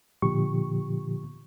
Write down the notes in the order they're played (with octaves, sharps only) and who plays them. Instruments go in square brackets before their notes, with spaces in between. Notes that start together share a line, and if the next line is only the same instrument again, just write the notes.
[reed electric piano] A#2 D3 F3 G4 C#6